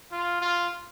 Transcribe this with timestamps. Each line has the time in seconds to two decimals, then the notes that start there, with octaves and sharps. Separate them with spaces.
0.12 F4
0.41 F4